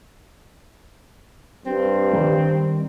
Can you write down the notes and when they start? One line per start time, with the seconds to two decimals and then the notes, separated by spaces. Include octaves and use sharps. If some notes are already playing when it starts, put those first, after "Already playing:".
1.66 G2 C4
2.13 D#3 G3